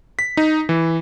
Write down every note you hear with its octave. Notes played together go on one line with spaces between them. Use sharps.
B6
D#4
E3